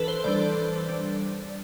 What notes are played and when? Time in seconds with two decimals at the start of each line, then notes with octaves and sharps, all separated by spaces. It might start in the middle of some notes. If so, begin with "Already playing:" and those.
Already playing: E3 D4 A4 B4
0.08 C5
0.24 E3 G3 D4 D5
0.89 G3 D4